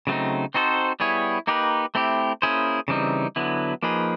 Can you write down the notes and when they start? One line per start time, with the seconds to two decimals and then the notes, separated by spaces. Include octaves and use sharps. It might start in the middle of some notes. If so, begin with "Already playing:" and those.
0.07 C#3 F#3 A3 C4 D#4
0.54 C4 D#4 F#4 A4 C5
1.00 G3 B3 E4 G#4 C#5
1.47 A#3 D#4 G4 B4
1.95 A3 C4 E4 G4
2.42 A#3 C#4 E4 G#4 C5
2.88 C#3 E3 G3 C4 D#4
3.36 D3 F#3 B3 E4
3.83 F3 A#3 D#4 G#4 B4